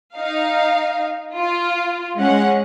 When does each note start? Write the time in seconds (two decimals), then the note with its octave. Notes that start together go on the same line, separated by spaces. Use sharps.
0.15 D#4 F5
1.36 F4
2.17 G#3 C#4 F#5